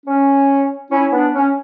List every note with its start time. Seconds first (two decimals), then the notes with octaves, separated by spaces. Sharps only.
0.06 C#4
0.91 C#4 E4
1.12 B3 D4
1.34 C#4